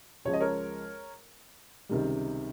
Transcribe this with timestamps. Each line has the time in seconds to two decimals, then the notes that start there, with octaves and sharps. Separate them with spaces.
0.25 C#2 C#3 F3 G#3 C#5
0.33 D#5
0.40 A#4 C#5
1.89 C#2 C3 D#3 G3